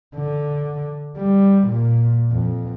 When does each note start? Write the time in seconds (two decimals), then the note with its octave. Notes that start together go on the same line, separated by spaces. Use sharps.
0.16 D3
1.18 G3
1.68 A#2
2.32 F2